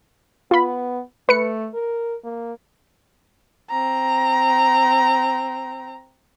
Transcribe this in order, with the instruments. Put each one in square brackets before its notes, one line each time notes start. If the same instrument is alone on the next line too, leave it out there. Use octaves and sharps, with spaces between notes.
[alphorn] B3 [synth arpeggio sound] F4 B5
[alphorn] A3 [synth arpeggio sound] B4 C#7
[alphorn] A#4
A#3
[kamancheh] C4 A#5